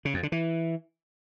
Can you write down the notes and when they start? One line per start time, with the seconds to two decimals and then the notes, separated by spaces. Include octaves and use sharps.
0.05 C#3
0.14 F2
0.23 D3
0.32 E3